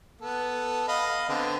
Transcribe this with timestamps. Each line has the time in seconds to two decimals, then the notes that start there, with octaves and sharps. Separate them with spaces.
0.21 B3 A4
0.88 D#5 F5 B5
1.29 D3 B3 C4